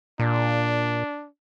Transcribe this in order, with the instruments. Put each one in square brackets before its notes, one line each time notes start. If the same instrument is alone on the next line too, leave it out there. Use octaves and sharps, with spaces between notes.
[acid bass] A#2 [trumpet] D4